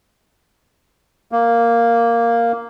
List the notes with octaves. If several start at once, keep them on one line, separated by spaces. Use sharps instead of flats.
A#3